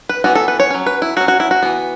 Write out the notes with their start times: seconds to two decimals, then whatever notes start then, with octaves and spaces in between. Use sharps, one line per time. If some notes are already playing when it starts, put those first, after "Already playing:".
0.09 B4
0.24 E3 B3 F#4
0.35 A4
0.48 B4
0.60 C#5
0.70 F#3 C#4
0.86 B4
1.02 E4
1.17 F#3 F#4
1.21 C#4
1.28 F#4
1.40 E4
1.51 F#4
1.63 E3 B3